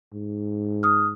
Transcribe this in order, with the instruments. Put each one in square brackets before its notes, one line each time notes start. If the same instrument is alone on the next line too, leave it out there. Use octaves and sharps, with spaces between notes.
[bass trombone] G#2
[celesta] D#6 F6